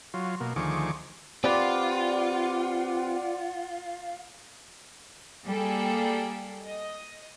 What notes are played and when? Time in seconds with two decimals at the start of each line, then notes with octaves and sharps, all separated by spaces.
0.14 F#3 F4
0.40 B2 A#3
0.56 D2 D#3 F3 G#4 C#6 D6
1.44 C4 F4 G4 B4 D5 F#5 C6
5.45 G3 A#3 G#4 A4 G5
6.65 D#5